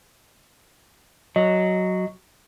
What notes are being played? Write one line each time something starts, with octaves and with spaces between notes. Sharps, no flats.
F#3 D#5